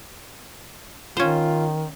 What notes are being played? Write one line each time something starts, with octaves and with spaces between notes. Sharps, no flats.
D#3 C#4 F4 C5